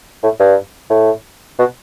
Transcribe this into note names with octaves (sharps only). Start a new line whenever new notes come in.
A2
G2
A2
B2